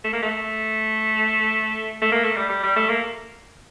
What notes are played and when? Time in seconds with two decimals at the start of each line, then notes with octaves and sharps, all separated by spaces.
0.04 A3
0.13 A#3
0.22 A3
2.02 A3
2.11 A#3
2.24 A3
2.36 G3
2.49 G3
2.63 G3
2.76 A3
2.89 A#3